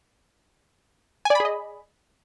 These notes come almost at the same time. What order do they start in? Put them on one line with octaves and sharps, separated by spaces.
G#5 D5 B5 G#4 D#5